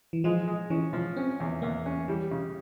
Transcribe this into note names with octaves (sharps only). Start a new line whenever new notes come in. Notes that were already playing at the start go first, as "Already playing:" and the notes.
E3
F3 G#3
G#3
E3 C#4
F3
C4 C#4
E2
E2 A#3
C#4
E3 G3
C#3